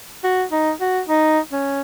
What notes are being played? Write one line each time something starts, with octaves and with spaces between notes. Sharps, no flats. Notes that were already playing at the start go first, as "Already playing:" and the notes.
F#4
D#4
F#4
D#4
C#4